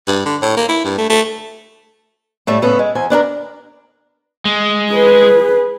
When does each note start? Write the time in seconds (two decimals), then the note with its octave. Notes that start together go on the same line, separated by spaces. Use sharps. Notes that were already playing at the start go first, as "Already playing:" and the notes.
0.07 G2
0.25 D3
0.42 A2
0.56 A#3
0.69 E4
0.84 G2
0.98 A3
1.10 A3
2.47 A2 G3 A3
2.62 A2 C#3 B3 A4
2.79 G#3
2.95 E2 C5 G#5
3.10 B3 D4 G4 A#4
4.45 G#3
4.92 G#4 B4